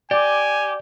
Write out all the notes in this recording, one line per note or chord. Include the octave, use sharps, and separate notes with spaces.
G4 D5 G#5